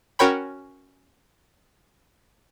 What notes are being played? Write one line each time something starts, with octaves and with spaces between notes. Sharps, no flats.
C#4 F#4 A#4 C#5 G5 B5